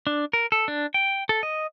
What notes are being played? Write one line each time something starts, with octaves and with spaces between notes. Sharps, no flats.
D4
A#4
A4
D4
G5
A4
D#5